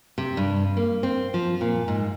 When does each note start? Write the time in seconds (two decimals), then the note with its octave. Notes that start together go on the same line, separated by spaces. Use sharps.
0.18 C3
0.37 G2
0.77 A#3
1.03 C4
1.34 F3
1.61 A#2
1.88 G#2